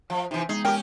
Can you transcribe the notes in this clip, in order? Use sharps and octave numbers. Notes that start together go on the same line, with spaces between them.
F3 C5 E5 F5
C3 E3 D#4
G#3 B3 D#4 G#4
C#4 G4 A#4 G5